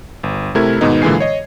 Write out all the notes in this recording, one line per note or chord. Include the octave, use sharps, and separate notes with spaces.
G1
C3 A3 E4 A#4 G#6
G#2 B2 D#3 B3 D#4
A#2 D3 E3 G#3 G#5 C7
C#5 D#5